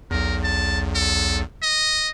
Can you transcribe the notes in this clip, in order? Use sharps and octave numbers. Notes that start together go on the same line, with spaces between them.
B1 E2 A#4
A5
A4
D#5